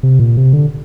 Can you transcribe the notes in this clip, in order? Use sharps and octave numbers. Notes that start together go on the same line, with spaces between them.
C3
A#2
C3
D3